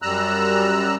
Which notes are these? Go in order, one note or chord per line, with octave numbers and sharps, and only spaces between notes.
F#2 G3 A#5 E6 F#6